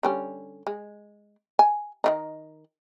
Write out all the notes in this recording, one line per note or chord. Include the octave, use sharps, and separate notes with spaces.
D3 G3 C#4
G#3
G#5
D#3 E3 D#4